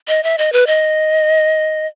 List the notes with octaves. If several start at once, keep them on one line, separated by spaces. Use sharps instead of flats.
D#5
E5
D#5
B4
D#5